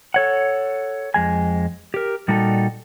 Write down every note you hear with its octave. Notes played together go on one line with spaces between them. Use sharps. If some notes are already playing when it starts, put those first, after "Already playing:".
A4 C#5 F#5
F2 G#3 G#5
G4 A#4
A#2 G3 D#4 F#4 A4